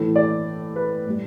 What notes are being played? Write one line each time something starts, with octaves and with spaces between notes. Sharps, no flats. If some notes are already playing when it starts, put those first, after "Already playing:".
Already playing: A2 E3 A3
D5
B4
A2 G3